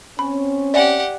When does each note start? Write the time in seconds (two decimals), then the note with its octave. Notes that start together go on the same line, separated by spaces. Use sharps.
0.19 C4 C#4 B5
0.74 G4 D5 E5 F#5 G#5